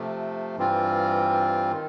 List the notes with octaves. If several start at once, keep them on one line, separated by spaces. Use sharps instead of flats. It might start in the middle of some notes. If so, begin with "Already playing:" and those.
Already playing: C3 F3 A3
G2 E3 G3 C4 F4
D#3